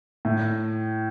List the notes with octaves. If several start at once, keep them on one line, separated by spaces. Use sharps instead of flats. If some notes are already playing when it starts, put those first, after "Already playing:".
A2